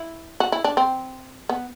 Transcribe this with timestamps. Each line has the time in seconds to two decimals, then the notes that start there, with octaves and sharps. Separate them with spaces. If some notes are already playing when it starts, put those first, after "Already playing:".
Already playing: E4
0.40 F#4
0.52 E4
0.64 D4
0.77 C4
1.49 B3